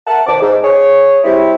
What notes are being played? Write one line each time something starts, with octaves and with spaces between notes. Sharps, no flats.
A#4 E5 F#5 A5
B2 D#3 C4 A5 D6
G#2
G#4 C#5
G3 C4 E4